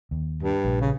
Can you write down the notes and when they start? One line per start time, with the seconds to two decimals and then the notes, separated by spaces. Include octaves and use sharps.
0.11 D#2
0.43 G2
0.64 A#1
0.81 C#3